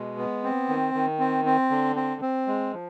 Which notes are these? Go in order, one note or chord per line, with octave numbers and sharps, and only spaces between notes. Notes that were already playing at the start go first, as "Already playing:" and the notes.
Already playing: B2 G#3
B3
C4
D#3
D#3
C4
C4
D3
C4
C4
G#3
F3